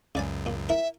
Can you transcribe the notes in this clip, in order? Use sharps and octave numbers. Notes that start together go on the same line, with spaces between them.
C#2 F#2 C#3 D5 G#5
A#2
E4 A#4 E5